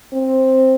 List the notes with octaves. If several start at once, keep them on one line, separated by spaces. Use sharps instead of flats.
C4